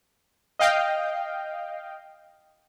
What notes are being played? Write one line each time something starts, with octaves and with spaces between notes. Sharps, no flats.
D#5 F5 G5